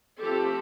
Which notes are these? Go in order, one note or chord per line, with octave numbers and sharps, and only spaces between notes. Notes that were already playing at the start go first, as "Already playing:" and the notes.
F3 A3 C4 G4 A4